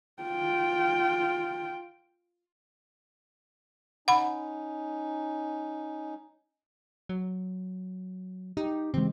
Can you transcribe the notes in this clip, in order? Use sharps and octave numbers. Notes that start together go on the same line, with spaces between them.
F4 G5
C#4 D#4 F#5 B5
F#3
D#4 G4
C#3 E3 G#3 C4